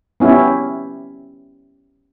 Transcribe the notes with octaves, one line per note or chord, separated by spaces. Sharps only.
B3 C#4 E4 G4